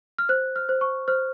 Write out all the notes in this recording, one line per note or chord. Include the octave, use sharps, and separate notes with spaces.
F6
C5 F#6
F6
C5
C#6
C5 F6